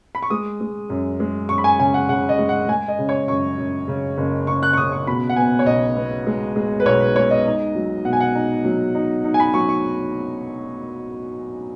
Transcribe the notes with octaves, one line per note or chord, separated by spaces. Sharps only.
B5
C#6
G#3 D#6
G#3
F#2
G#3
F#2 C#6
B5
G#5
C#3 G#5
F#5
C#3 F#5
D#5
G#3
F#5
G#3 G#5
D#5
C#3
C#5
F#2 C#6
F#2
C#3
F#1
C#3 C#6
F#6
C#6
C#3 D#6
C#6
B2 B5
F#5
B3 G#5
C#5
B1 D#5
B3
G#3
G#3
B4
B1 C#5
B4
G#3 C#5
D#5
D#4
F#3
B2 F#5
G#5
F#5
D#4
F#3
D#4
D#4
G#5
B5
F#3 C#6
C#6